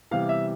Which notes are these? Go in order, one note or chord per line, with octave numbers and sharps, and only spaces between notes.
C3 E3 G3 B3 F5
E5